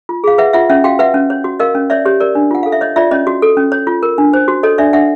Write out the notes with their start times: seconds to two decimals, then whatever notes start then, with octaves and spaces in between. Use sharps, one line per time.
0.09 F4
0.24 G#4 F5
0.38 B4 E5 F#5
0.53 F4 E5 F#5
0.69 C#4 E5 F#5
0.84 F#4 F5 G5
0.99 B4 E5 F#5
1.14 C#4
1.30 C#5
1.44 F#4
1.60 A#4 D#5 F5
1.75 C#4
1.90 C#5 D5 E5
2.05 G4 C#5
2.21 A#4 D5
2.35 D4
2.51 F4 F#5
2.63 A4 F5
2.72 E5
2.81 C#5 D#5
2.96 F4 D5 E5
3.11 C#4 C#5 D#5
3.27 F#4
3.42 A4
3.57 C#4
3.72 C#5
3.87 F4
4.03 A#4
4.18 D4
4.33 C5
4.48 F#4
4.63 A4 C#5 D#5
4.78 D4 D5 E5
4.93 D4 E5 F#5